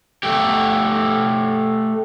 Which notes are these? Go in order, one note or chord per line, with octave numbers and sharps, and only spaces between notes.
A3 G4